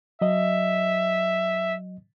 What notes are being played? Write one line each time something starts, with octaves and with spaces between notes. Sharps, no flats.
F#3 D#5 E5